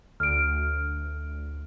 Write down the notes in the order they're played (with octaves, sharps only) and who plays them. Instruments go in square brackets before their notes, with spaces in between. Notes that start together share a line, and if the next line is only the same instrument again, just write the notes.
[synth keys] D2 [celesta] F6 D7